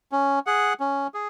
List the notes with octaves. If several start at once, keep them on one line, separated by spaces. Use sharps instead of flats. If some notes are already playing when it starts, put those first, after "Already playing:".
C#4
G#4 F#5
C#4
G#4